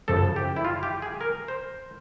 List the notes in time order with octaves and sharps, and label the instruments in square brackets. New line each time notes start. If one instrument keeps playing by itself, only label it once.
[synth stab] F#2 C#3 F3 [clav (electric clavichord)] A4
[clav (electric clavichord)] G4
E4
F4
G4
G#4
A#4
C5